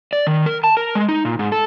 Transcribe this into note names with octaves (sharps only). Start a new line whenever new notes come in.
D5
D#3
A#4
A5
A#4
G#3
D#4
A#2
G#2
A4